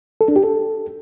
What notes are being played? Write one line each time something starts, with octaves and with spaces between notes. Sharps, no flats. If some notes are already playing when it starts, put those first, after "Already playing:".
A4
D4
G4
A4